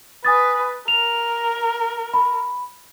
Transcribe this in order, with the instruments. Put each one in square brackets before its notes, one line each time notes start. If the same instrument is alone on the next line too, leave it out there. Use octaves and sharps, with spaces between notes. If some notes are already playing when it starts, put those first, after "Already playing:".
[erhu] B4 [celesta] G#5 D#6 A6
[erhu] A#4 [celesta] F7
[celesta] B5